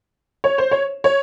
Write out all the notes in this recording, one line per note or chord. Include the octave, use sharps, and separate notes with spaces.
C#5
C5
C#5
C#5